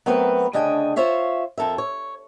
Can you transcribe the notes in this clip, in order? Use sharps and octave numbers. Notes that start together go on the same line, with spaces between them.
F#3 A3 B3 C4 A#4 B4
D2 C#3 D4 D#5 G5 G#5
F4 C5 C#5 E5 F5
F2 A4 A#4 E5
C#5